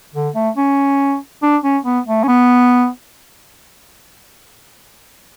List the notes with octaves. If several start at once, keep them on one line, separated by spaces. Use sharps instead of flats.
D3
A3
C#4
D4
C#4
B3
A3
C#4
B3